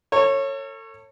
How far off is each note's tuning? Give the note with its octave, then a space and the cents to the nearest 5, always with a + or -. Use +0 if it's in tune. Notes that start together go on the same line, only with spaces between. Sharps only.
A4 +40 C#5 -15